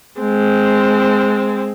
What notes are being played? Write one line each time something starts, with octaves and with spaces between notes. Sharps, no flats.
G#3 C4